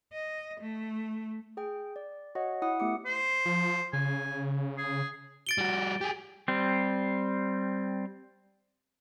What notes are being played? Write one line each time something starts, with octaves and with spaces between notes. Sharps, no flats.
D#5
A3
G#4 G5
D5
F#4 C#5 D#5 F#5
E4 F#5 D#6
A3 B3 E4 G4 D6 C#7
C5
F3
C#3 G#5
G#4
A6 D7 G7
G3 F#4
G4 G#4
G3 C4